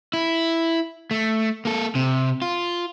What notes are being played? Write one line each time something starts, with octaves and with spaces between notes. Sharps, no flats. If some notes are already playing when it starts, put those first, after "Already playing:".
E4
A3
A#3 A4
C3
F4